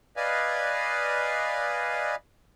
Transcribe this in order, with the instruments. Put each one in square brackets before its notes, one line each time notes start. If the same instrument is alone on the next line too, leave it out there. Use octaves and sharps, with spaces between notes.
[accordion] B4 D5 D#5 F5 G#5